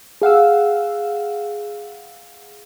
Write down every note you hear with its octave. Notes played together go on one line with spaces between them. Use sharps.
G#4 F5 F#5 E6